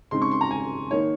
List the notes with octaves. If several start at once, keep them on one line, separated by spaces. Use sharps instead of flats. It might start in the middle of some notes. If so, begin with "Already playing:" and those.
C#3 G#3 C4 D#4 C6
C#6
C6
A#5
G#5
D#3 A#3 D#4 C#5